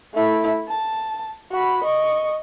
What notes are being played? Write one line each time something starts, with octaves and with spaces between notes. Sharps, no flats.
A3 E4
A5
F#4 B5
D#5 C#6